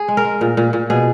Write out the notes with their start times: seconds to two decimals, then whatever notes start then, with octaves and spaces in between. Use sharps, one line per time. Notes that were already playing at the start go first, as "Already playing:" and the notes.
Already playing: G#4
0.08 G#3
0.17 A#4
0.25 G#3
0.41 A#2
0.57 A#2
0.73 A#2
0.90 B2 G#4